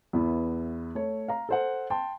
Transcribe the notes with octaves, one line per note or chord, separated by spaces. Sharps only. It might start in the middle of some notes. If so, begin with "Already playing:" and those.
E2 B3 E4
A3 C#5
F5 A#5
A4 C5 F#5
G5 A5 C6